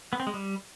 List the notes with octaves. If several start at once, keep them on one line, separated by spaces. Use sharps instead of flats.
B3
C4
G#3
G3